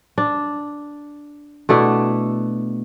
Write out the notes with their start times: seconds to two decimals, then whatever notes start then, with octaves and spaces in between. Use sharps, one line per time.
0.18 D4
1.69 B2 A3 D4 E4